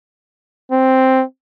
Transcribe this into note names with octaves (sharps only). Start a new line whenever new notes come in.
C4